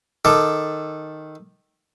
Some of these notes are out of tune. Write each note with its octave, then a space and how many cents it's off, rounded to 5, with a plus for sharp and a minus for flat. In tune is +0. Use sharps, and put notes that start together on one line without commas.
D#3 +0 A4 +0 D6 +15